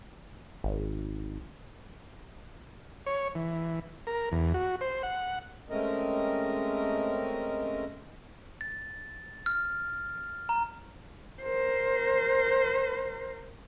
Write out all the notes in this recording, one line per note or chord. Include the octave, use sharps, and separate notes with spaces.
G#1
C#5
E3
A#4
E2
F#4
C5
F#5
G#3 A3 C4 C#4 A#4 D#5
A6
F6
A#5
A#4 C5